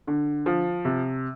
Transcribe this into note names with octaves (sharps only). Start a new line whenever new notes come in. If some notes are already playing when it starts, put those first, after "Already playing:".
D3
F3
C3